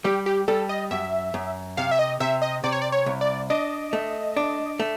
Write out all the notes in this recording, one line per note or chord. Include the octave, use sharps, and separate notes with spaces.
G3 G4
G4
G3 A4
D#5
F#2 E5
F#2
C3 F5
E5
D#5
C3 E5
D#5
C3 D5
C#5
D5
C#5
C2
D5
D4 D#5
A3
D4
A3